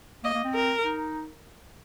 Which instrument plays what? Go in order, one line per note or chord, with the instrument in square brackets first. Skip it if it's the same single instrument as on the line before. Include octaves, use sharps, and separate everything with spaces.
[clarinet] A#3 [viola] D#5
[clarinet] A#3
C4
[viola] A#4
[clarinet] D#4